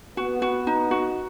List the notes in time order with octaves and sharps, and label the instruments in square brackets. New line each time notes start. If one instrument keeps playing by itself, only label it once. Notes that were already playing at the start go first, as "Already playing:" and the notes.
[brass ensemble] B3 [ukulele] F#4
[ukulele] F#4
D#4
F#4